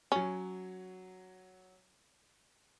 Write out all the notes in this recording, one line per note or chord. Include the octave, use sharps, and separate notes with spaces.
F#3 C#4 C#5